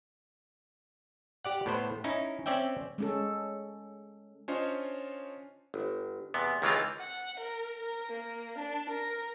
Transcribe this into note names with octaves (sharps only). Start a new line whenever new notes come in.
G4 D5 F#5
A2 B3 C5
C#4 D#4 E4
C4 C#4 D5 E5 G5
G#3 C#4 A4
C#4 D4 F4 C5 C#5 D#5
G1
E2 C3 B3
C#2 D#3 E3 G#3 C4 F4
F#5
A#4
A#4
A#3
D4
A#4